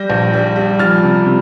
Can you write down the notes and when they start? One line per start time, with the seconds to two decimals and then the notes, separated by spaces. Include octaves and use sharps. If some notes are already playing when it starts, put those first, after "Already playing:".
Already playing: G3 G6 A#6
0.10 A#1
0.33 G3
0.56 G3
0.79 F3 F6 A6
1.03 C3
1.26 C3